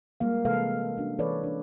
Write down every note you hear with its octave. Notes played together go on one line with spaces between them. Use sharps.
G3 G#3 A#3 F5
C3 E3 G#3 A4 B4 F5
C#4 D4 F#4
E3 A4 B4 C#5 D5
C#4 D4